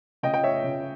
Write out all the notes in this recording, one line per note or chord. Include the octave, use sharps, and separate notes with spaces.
C#3 D#5 G5
G5
C#5 E5
C#3